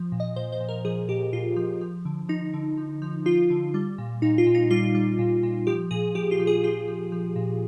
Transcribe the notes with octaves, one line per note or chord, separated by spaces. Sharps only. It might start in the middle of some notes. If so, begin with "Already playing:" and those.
Already playing: F3
A#2
D#5
A#2 C5
C5
A#2
A#4
F3 G#4
A#2 G4
A#2 F4
F3
F3
D3
F3 D#4
D3
F3
F3
F3 F4
D3
G3
A#2
A#2 D#4
F4
A#2
D#4
G3 F4
G3
A#2
A#2
F3 G4
A#2 G#4
F3 G4
F4
F3
G#4
F3 F4
F3
F3
A#2